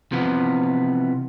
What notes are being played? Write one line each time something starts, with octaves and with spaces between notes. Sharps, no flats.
C3 E3 F3 B3